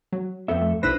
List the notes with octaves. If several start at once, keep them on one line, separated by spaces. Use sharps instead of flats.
F#3
F2 B3 C4 A4 E5
A3
B1 D4 E4 B4 C5 E6 A#6